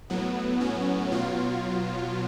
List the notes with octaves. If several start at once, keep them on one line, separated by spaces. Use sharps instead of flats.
A2 F#3 B3
C#4
B2 F#3 F4